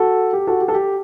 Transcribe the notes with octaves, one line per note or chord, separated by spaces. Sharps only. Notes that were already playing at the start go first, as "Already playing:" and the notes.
Already playing: F#4 A4
G4
F#4 A4
G4
A4
G4